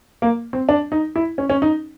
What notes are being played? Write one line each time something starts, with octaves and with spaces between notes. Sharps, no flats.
A#3
C4
D4
D#4
E4
C#4
C#4
D#4